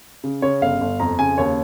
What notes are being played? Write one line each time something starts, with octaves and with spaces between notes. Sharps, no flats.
C#3
C#3 C#5
G1 F5
G1
F2 A#5
C#3 G#5
D#2 C#5